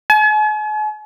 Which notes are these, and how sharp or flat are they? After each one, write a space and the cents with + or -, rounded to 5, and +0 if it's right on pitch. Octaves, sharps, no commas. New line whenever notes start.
G#5 +45